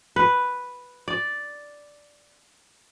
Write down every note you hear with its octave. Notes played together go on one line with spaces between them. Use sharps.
B4
D5